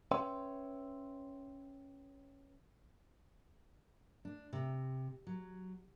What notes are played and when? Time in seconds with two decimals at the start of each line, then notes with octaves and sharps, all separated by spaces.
0.11 C#4 B4 C#5 E5 G5 C6
4.25 D4
4.53 C3
5.27 F#3